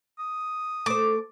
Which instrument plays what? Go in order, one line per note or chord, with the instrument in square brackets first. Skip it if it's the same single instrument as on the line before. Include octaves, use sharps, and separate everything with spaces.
[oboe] D#6
[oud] A3 C5 [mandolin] D6